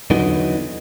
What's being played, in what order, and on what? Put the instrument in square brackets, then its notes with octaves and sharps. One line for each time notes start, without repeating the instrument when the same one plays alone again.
[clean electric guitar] E2 D3 E3 F#3 B3 D#4